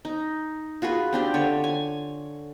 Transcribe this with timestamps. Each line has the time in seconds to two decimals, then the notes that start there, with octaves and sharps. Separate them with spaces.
0.05 D#4
0.82 F4 F#4 G#4 B4
1.13 C4 D4 G4
1.34 D3 C#5
1.64 G#5